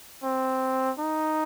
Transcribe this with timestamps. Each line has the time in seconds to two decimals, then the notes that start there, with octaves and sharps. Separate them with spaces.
0.24 C4
0.99 D#4